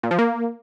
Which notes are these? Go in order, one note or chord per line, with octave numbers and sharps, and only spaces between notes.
A#2
F3
A#3